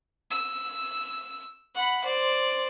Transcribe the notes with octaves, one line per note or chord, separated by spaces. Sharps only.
E6
F#5 B5
C5 D5